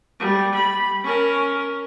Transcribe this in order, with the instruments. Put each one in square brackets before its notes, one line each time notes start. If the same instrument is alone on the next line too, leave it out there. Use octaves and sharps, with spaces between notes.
[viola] G3
B5
C#4 A#4